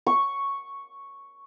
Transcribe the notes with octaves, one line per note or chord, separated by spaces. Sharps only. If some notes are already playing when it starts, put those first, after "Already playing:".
C#6